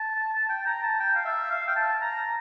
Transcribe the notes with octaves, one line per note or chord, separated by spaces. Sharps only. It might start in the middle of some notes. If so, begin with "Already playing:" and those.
Already playing: A5
G5
A#5
A5
G5
F5
E5
F5
G5
A5
A#5